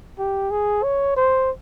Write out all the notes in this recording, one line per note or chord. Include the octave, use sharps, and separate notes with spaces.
G4
G#4
C#5
C5